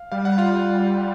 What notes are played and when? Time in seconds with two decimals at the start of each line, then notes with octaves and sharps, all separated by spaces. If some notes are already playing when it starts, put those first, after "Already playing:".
Already playing: F5
0.12 G3 F5
0.25 F#5
0.38 F4 F5